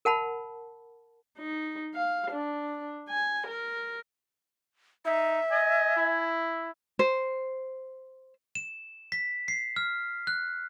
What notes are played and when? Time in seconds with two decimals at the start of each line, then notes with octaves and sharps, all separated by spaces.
0.05 A#4 F#5 A5 B5
1.38 D#4
1.95 F5
2.31 D4
3.09 G#5
3.47 A#4
5.05 D#4 E5
5.51 D#5 G#5
5.96 E4
6.99 C5
8.55 E7
9.12 B6
9.48 C7
9.76 F6
10.27 F#6